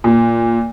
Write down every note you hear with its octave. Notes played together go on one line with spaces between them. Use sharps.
A#2